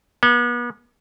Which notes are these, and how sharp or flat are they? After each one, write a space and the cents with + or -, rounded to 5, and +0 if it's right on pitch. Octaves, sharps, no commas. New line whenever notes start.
B3 -40